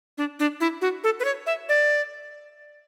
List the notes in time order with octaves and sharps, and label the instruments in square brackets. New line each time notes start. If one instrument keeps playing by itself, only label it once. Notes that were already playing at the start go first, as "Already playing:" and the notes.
[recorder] D4
D4
E4
F#4
A4
B4
C#5
E5
D5